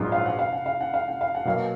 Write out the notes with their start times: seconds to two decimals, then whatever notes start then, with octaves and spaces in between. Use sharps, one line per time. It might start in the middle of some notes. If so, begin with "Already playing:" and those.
Already playing: A#1 G#2 F#3 B3 F4
0.12 F5
0.26 F#5
0.39 F5
0.53 F#5
0.66 F5
0.81 F#5
0.94 F5
1.08 F#5
1.21 F5
1.35 F#5
1.45 B2 F#3 A#3 F5